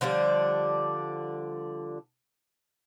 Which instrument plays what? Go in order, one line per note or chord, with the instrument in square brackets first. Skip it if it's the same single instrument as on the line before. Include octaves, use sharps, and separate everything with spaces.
[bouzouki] D3 F3 G3 D4